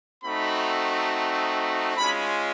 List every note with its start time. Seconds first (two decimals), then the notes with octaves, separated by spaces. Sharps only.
0.24 A3 C4 D#4 F#4 B5
1.97 G#3 C#4 F4 B5